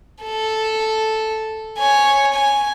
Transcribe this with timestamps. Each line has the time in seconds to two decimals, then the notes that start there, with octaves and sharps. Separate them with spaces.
0.24 A4
1.78 C#5 G#5
2.34 G#5